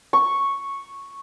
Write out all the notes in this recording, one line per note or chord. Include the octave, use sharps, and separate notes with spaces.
C#6